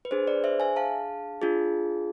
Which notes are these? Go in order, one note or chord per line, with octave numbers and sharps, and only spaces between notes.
B4
D4 G#4 C5
B4 D5
C5 E5
E5 G#5
F5 A5
D4 F4 G#4